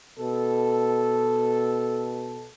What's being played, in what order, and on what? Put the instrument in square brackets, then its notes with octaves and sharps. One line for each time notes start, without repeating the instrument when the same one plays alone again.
[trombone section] B2 A4